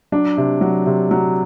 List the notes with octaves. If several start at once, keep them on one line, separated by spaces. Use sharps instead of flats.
F#3 D4
C3
F#3
C3
F#3